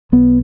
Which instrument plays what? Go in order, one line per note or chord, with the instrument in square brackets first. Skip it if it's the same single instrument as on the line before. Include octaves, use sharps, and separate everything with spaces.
[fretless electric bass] B1 B3